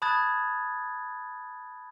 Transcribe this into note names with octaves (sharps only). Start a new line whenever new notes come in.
A5 B5 D#6 F#6 G#6 A6